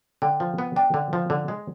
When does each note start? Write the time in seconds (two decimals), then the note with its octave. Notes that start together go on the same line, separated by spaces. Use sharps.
0.22 D3 G5
0.40 F3
0.58 B3
0.76 D4 G5
0.94 D3
1.13 F3
1.30 D3
1.48 G#3